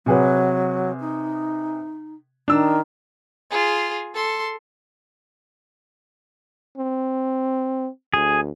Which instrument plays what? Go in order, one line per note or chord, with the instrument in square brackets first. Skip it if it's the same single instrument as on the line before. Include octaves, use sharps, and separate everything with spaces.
[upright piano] C3 G#4 B4 [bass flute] F#3
[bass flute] D#4
[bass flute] D#3 [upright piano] D4 E6
[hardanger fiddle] F4 G#4
A4 C6
[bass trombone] C4
[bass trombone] D2 [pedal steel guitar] G#4